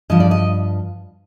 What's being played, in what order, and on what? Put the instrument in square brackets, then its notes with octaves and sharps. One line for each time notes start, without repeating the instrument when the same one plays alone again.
[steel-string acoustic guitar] G2 F3 D#5
D5
D#5